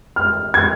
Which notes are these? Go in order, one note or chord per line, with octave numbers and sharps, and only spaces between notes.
F6
G#6